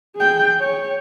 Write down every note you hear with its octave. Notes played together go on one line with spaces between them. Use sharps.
G#4 G5
C#5